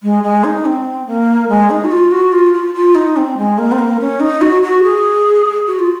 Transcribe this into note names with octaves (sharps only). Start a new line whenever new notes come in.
G#3
G#3
D#4
C4
A#3
G#3
D#4
F#4
F4
F#4
F4
F4
F4
D#4
C4
G#3
A#3
C4
A#3
C#4
D#4
F#4
F#4
G#4
F#4
F4